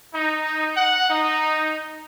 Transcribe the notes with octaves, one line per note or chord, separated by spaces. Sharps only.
D#4
F#5
D#4